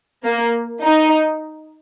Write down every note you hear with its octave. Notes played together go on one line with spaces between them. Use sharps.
A#3
D#4